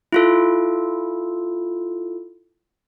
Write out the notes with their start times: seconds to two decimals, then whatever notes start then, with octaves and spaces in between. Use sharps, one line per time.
0.12 E4 F4 A4